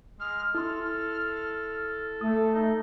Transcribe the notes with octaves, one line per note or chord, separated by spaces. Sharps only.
G#3 F6
E4 A4 C6 F6
A3 D#6
D#4